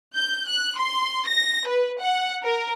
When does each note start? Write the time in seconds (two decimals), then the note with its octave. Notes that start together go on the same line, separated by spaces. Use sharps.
0.14 G6
0.47 F#6
0.77 C6
1.26 A#6
1.67 B4
2.00 F#5
2.42 A#4